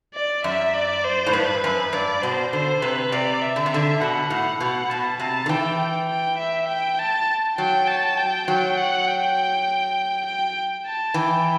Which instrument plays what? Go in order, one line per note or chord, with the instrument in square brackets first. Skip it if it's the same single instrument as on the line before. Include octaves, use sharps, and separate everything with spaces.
[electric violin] D5
[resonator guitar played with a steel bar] F#2 [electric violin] E5
[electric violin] D5
C5
[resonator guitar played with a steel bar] A2
[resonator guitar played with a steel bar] G2 [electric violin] B4
[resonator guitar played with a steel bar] F#2 [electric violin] B4
[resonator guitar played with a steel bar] G2 [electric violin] D5
[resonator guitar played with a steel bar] B2 [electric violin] C5
[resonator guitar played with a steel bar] D3 [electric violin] C5
[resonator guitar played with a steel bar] C3 [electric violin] B4
[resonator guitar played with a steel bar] C3 [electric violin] D5
[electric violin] E5
[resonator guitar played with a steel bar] D3
C3
[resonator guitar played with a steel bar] D3 [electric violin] E5
[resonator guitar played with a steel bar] B2 [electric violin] F#5
[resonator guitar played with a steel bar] A2 [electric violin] F#5
[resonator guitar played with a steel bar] B2 [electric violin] F#5
[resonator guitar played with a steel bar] B2 [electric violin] A5
[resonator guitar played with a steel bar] C3 [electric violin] A5
[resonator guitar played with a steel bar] D3
[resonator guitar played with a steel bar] E3 [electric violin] G5
[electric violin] G5
G5
E5
G5
A5
[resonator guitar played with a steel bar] F#3 [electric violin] G5
[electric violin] A5
G5
[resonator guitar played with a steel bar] F#3 [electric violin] G5
[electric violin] F#5
G5
G5
A5
[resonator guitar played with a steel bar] E3 [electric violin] G5